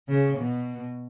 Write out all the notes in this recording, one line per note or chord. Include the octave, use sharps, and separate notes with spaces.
C#3
B2